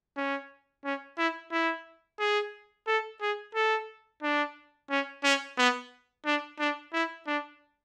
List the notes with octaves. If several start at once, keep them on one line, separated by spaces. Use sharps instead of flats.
C#4
C#4
E4
E4
G#4
A4
G#4
A4
D4
C#4
C#4
B3
D4
D4
E4
D4